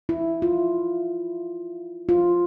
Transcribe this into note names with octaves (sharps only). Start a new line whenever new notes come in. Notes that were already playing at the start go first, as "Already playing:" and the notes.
E4
F4
F4